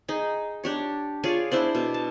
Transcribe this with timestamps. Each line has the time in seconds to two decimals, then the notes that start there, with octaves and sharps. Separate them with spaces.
0.08 D#4 G#4
0.64 D4 G4 C#5
1.23 F4 G#4 C#5 D5
1.51 D4 E4 C5 D5
1.75 B2
1.94 A5